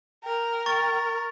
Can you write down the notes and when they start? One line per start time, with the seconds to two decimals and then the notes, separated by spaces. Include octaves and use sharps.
0.24 A#4 G5
0.66 C#6 A6